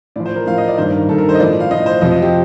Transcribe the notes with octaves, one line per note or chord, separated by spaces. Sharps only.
A2 F3 D5
C5
A#4
A2 F3 F5
D#5
D5
G2 D#3 C5
A#4
G2 D#3 A4
A#4
C5
D#5
A2 F3 D5
F5
A2 F3 D#5
C5
F2 C3 F3 D#5
D#5
G4